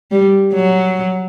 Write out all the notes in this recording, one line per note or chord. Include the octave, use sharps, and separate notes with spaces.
G3
F#3